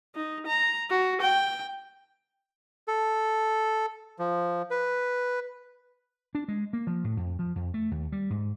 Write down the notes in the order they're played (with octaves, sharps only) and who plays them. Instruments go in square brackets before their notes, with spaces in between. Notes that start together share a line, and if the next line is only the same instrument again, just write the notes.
[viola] D#4
A#5
F#4
G5
[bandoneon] A4
F3
B4
[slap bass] D4
G#3
A#3
F3
A2
F2
F3
F2
A3
D#2
G3
G#2